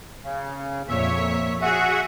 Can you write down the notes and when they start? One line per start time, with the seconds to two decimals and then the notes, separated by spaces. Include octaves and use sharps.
0.22 C#3
0.88 F2 A#2 C#5 E5
1.62 F#4 G#4 E5 F#5